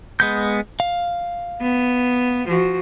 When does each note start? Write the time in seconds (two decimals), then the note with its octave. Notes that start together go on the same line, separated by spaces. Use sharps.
0.20 G#3 B3 G6
0.80 F5
1.62 B3
2.48 F3 F#4